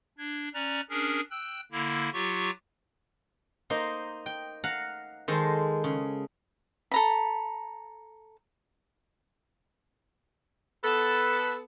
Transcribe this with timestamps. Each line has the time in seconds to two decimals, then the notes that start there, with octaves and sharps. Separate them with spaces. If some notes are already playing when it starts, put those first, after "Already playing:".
0.18 D4 G#6
0.54 C#4 D5 A#5 F#6
0.90 C#4 D4 G#4 A#4
1.31 G5 E6 F#6
1.72 D3 A#3 E4
2.13 F#3 F4 G4 C#6
3.70 A#3 D#4 C5
4.26 G5
4.64 F5 F#5 A#5
5.28 D#3 G#3 A4 C5
5.84 C#3
6.91 A4 A#5 B5
10.84 B3 A4 B4